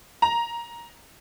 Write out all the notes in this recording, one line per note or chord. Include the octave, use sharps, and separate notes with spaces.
A#5